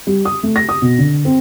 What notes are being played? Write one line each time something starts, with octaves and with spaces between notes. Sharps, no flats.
G3
D#6
A3
A#6
D#6
B2
D3
C4